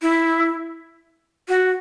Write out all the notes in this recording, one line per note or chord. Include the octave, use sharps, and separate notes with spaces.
E4
F#4